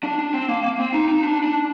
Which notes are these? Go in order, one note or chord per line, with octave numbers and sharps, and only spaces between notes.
D4
D4
C4
A#3
A#3
C4
D#4
D#4
D4
D4